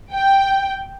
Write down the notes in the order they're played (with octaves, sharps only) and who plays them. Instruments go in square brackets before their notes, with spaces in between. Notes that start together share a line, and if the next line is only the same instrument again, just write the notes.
[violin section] G5